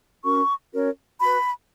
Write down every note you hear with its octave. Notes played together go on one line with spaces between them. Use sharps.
C#4 F#4 A#4 C#6
C#4 F#4 A#4 C#5
F#4 B4 B5